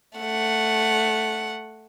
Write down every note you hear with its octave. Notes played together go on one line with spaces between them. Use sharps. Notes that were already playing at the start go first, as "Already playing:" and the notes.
A3 F#5